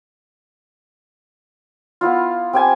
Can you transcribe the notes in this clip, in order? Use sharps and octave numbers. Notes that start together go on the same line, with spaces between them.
B3 E4 F4
C4 G4 G#5